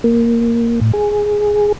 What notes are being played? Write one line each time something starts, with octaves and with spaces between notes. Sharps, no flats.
A#3
A2
G#4